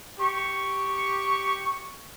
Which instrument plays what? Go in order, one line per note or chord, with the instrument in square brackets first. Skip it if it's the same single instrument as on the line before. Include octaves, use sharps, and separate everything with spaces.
[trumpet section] G4 C#6